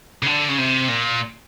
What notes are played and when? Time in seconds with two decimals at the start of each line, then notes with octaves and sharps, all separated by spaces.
0.23 C#3
0.26 D3
0.48 C#3
0.58 C3
0.88 A#2